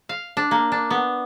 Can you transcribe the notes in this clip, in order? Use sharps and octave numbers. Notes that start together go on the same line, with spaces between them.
F5
D4
A#3
D4
B3